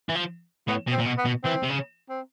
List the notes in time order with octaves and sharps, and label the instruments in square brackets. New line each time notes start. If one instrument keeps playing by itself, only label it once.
[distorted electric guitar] E3
F3
[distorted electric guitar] A2 [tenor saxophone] B3
[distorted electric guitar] B2
[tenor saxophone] C4
[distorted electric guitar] A#2
B2
[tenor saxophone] B3
[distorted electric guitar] B2
[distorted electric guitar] E3 [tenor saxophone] C4
[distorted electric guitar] C3
C#3
[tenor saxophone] C4